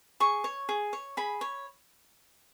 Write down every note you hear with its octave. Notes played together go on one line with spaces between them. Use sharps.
G#4 C#6
C#5
G#4
C#5
G#4 B5
C#5